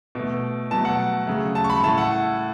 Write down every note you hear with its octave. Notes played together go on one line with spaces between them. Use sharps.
B2 A3
B2 F#3 A3 A5
F#5
C#3 F#3 A3
A5
C#6
B5
A2 A3 A5
F#5